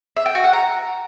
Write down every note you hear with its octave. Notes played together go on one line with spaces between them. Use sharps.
E5
G5
F#4
F#5
A#5